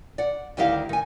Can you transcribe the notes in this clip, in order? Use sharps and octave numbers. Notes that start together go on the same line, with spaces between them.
D5 F#5
D2 D#3 G3 E4 G4 F5
D#3 G#5